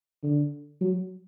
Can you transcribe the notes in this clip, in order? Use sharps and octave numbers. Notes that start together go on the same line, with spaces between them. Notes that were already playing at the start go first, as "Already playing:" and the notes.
D3
F#3